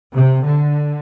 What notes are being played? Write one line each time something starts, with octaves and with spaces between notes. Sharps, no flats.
C3
D3